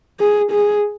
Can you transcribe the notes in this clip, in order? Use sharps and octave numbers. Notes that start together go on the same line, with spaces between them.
G#4
G#4